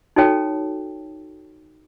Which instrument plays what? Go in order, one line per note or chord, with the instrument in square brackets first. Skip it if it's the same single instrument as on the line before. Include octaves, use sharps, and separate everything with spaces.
[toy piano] D#4 F#4 A4 C#5 G5 A5